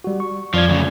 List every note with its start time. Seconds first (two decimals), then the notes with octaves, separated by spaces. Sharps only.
0.04 G3 F#4
0.20 C#6
0.54 F2 F3 D5 G#6
0.69 D2 C#3